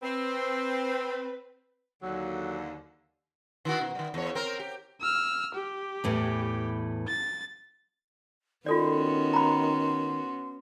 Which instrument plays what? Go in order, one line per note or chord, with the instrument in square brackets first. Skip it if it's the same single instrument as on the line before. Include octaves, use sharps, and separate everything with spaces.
[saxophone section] C4 [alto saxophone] B4
[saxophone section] D#2 D3 [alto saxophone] F#3
[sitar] D#3 E4 F#4
B2
D#3 G3
E2 C#5
C4 A#4
G4
[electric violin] E6 F6
G4
[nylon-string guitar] E2 A2 E3
[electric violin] A6
[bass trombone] D#3 [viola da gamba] B3 C#4 F#4 [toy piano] F4 A4 D5 [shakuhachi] C6
[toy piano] A#5 B5